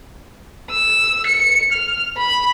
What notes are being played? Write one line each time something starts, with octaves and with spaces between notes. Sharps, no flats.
E6
C#7
F6
B5